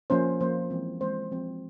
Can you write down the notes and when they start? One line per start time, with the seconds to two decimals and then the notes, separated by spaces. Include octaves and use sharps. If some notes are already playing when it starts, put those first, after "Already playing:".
0.10 F3 A#3 C#4 C5
0.41 F3 A#3 C#4 C5
0.70 E3 G#3 C4
1.00 E3 G#3 C4 C5
1.32 F3 C4